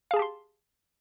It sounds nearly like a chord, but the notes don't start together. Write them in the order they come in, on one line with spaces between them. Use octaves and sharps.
F5 G#4 A5 G4 C6